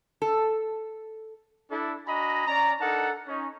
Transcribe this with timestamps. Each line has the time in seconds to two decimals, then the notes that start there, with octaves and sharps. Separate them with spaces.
0.22 A4
1.71 D4 E4 A4
2.06 D4 F#4 D#5 G#5 A#5 B5
2.47 C#4 D5 A#5
2.80 D4 D#4 A4 A#4 F#5 A5
3.27 C#4 D#4 C#5